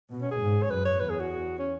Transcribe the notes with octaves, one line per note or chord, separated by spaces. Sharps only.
B2
C#4
G#4
G#2
C#5
F#2 B4
C#5
E2 B4
G#4
F#4
C#4